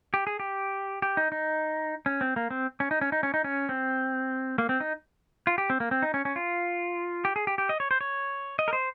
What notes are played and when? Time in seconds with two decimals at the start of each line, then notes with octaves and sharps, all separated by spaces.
0.14 G4
0.27 G#4
0.40 G4
1.02 G4
1.17 D#4
1.32 D#4
2.06 C#4
2.21 C4
2.36 A#3
2.51 C4
2.80 C#4
2.91 D#4
3.01 C#4
3.12 D#4
3.23 C#4
3.34 D#4
3.44 C#4
3.69 C4
4.58 A#3
4.69 C4
4.80 D#4
5.47 F4
5.58 G4
5.70 C4
5.80 A#3
5.91 C4
6.02 D#4
6.14 C#4
6.25 C#4
6.36 F4
7.25 G4
7.36 G#4
7.47 G4
7.58 G4
7.69 D#5
7.80 C#5
7.91 C5
8.01 C#5
8.59 D#5
8.68 A#4
8.73 C5